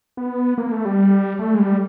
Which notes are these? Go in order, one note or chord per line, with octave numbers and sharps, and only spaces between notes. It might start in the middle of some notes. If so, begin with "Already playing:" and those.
B3
A#3
A3
G3
A3
G#3
G3